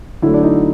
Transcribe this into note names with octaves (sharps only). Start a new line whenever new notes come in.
D3 F#3 A3 E4
D4
D#4